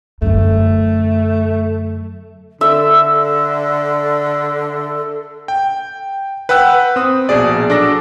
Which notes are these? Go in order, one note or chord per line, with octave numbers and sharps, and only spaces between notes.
F#2 D3 A3
D3 A4 E5
G5
B4 F#5 G5 E6 F#6
C4 D#6
A#1 B2 G#4 D5
F#3 D4 A4 D6 A#6